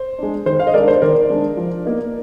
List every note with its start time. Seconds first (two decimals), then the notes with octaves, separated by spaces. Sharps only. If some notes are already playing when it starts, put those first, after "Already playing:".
Already playing: C5
0.18 G#3 D4
0.46 D#3 C5
0.59 F5
0.67 D#5
0.74 G#3 D4 A#4 D5
0.88 C5
1.02 D#3 A#4 D5
1.30 G#3 D4
1.57 F3
1.85 A#3 D#4